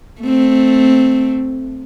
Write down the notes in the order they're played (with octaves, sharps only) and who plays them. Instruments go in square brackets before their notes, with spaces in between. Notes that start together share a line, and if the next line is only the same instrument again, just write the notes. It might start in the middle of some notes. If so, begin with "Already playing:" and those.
[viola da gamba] A3 C4